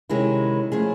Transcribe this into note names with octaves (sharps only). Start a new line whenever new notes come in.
C3 D#3 G#3 C#4 E4
F3 A3 C#4 E4 G#4